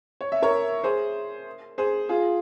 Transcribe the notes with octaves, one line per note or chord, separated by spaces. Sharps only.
C#5
E5
A#4 C#5
G#4 C5
G#4 C5
F4 G#4